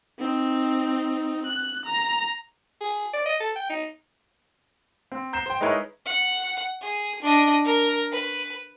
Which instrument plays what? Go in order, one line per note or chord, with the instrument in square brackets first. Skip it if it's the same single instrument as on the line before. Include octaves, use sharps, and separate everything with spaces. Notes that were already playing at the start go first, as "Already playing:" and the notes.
[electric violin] C4 D#4
F#6
A#5
[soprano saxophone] G#4
D5
D#5
A4
G5
D#4
[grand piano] C4
A#5 G6 C7 E7
C5 G5
G#3 D#4 E4 A#4 B4 C#5
[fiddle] F#5
G#4
D4 D#5
A#4
B4